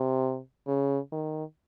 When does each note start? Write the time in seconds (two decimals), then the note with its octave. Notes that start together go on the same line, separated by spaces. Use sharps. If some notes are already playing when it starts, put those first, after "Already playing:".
Already playing: C3
0.67 C#3
1.12 D#3